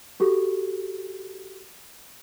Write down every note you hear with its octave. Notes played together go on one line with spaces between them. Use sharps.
F#4 G4 A4